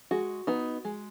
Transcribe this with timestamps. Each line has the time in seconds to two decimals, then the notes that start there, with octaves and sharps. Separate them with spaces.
0.11 G#3 F#4
0.47 B3 D#4
0.85 G#3